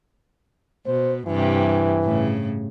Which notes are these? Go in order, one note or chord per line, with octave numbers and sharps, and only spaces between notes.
B2 C5
G2 C3 E3
A2 C#3